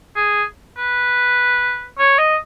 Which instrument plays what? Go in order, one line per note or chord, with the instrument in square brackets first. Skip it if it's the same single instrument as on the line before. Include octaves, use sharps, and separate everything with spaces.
[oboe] G#4
B4
C#5
D#5